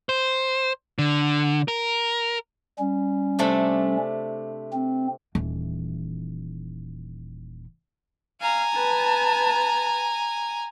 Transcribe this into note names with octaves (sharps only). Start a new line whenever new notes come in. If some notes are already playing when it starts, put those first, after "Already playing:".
C5
D3
A#4
G3 C#4
C3 A3 D4
C4
D#1 E3
F5 G#5 A#5
B4 A5